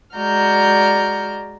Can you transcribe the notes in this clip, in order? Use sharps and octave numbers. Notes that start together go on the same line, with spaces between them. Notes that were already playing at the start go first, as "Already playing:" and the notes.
G#3 F#4 D5 A#5 F6 G6